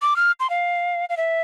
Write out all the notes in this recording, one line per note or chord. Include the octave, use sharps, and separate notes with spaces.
D6
F6
C6
F5
F5
E5